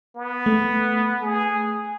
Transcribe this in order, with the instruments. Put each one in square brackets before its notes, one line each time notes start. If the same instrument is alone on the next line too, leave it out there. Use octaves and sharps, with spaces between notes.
[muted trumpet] B3
[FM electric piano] A3
[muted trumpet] G#4